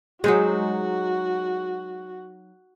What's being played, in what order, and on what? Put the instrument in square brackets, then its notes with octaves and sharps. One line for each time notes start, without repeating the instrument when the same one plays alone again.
[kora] F#3 D#4 C5 [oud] G#3 [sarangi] F#4